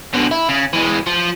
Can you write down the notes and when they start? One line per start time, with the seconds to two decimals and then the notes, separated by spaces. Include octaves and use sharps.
0.13 B2 D3
0.31 E4
0.49 C#3
0.73 E3 G#3
1.07 F3